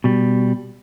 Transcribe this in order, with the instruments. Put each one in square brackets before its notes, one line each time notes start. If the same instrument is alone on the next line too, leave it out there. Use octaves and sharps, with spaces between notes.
[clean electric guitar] B2 G3